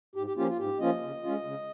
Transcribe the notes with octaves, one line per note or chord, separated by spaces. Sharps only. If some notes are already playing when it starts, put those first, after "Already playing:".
G#2 G4
G4
F3 A#3 C#4 F4 G4
F4
G#2 G4
F3 A#3 C#4 F4 D#5
C#3
G#3 C#4 F4
C#3